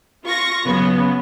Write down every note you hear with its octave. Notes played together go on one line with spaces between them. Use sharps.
F4 C#6 A#6
C#3 F#3 B3